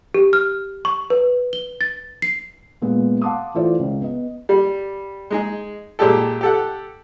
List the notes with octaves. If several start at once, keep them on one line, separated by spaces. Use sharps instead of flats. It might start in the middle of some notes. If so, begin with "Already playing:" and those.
G4
F6
C#6
B4
G7
A6
C7
A#2 G#3 B3
F5 F#5 A5 C6 D6 D#6
E3 A3 E4 F4 C5 D5
C#2
B3 D#5
G3
G#3 D#4 G#4
A#2 G#3 G4 A4
G4 A4 F#5